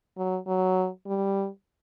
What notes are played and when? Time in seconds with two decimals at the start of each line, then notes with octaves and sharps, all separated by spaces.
0.17 F#3
0.47 F#3
1.06 G3